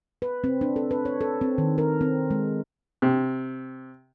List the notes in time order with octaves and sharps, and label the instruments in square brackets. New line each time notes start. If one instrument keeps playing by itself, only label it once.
[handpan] B4
C4
D4
A4
B4
C#5
A4
C4
D#3
A#4
C4
G#3
[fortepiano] C3